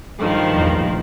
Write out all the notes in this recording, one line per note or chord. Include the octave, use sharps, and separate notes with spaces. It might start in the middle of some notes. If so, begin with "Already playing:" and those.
G2 D#3 F3
A#1 E2 A2